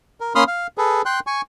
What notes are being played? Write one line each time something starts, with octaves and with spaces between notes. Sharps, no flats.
A#4
A#3 C#4 B5 C6 D#6 F6
F5
G#4 A4 B4
G5 C6 F#6
G#5 C#6